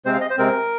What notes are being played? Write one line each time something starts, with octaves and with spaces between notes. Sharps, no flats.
C3 G#3 C4 C5
F5
D#5
C5
C3 G#3 C4 A#4